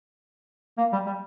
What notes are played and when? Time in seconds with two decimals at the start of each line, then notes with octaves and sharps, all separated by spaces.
0.78 A#3
0.92 G3
1.06 G3